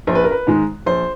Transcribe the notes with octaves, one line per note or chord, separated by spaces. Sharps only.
A#1 C5
B4
A#4
B4
G#2 D#3 G#3
A#1 C5